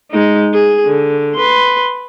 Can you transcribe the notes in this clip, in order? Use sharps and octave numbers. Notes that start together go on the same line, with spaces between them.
G#3 D#4
G#4
D3
B4 C6